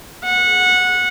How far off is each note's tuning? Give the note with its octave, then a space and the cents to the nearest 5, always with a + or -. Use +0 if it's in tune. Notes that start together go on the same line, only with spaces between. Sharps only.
F#5 -15